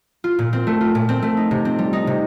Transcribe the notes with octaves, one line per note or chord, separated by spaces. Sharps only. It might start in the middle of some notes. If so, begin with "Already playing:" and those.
F4
A#2
C4
A3
F4
A#2
C4
A3
D#4
C3
C4
G3
D#4
C3